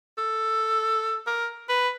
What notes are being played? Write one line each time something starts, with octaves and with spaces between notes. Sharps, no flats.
A4
A#4
B4